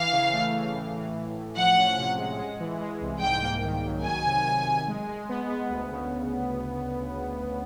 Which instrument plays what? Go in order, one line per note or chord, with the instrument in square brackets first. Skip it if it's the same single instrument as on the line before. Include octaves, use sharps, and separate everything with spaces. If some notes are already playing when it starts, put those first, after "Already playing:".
Already playing: [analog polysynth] E3 [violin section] F5
[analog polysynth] C#3
A3
E3
A2
E3
E3
A2
[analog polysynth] F3 [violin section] F#5
[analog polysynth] C#4
C3
G#3
G#3
E3
G#3
C2
[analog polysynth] G#2 [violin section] G5
[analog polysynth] A#3
D#3
F#3
[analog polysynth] D#3 [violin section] G#5
[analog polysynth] C3
C3
C3
G#3
G#3
B3
B3
D2
C#3